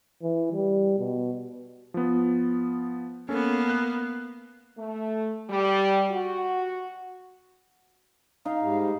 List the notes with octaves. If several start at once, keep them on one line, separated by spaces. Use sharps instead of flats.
E3
G3
B2
F3 B3
A#3 B3 C#4 A4
F#6
A3
G3
F#4
D#4 F5
G#2 G3